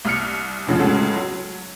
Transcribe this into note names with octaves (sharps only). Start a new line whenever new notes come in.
C2 F6 C#7
F1 D2 C#3 F3
C#2 A2 C#3 F#4 A4
F#3